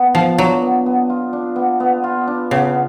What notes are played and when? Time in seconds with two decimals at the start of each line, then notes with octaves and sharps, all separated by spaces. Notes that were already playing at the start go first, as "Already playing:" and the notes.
Already playing: B3
0.14 F3 F4
0.38 F#3 D4
0.62 B3
0.86 B3
1.10 F4
1.33 D4
1.56 B3
1.80 B3
2.04 F4
2.28 D4
2.51 C#3 B3